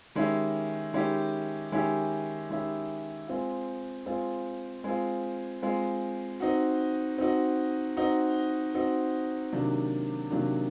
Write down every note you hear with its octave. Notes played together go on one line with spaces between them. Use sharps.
D#3 G#3 C#4 E4 G4
D#3 G#3 C#4 E4 G4
D#3 G#3 C#4 E4 G4
D#3 G#3 C#4 E4 G4
G#3 C4 F4
G#3 C4 F4
G#3 C4 F4
G#3 C4 F4
C4 D#4 F#4
C4 D#4 F#4
C4 D#4 F#4
C4 D#4 F#4
C3 D#3 F#3 A#3 D4
C3 D#3 F#3 A#3 D4